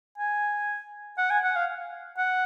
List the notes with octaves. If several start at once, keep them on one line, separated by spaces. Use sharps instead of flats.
G#5
F#5
G#5
F#5
F5
F#5